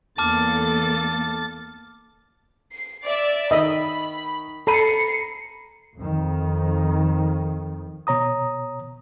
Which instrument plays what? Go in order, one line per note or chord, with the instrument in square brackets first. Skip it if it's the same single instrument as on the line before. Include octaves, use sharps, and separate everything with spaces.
[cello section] E2 A#3 A4 [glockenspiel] A5 D6 F6 [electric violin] A6
[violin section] C7
D5 E5
[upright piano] D#3 [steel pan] D#5 E5 [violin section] B5
[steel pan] A4 [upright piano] A#5 B5 D#7 [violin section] C7 C#7
[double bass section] F2 D#3
[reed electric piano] B2 C#5 A#5 D#6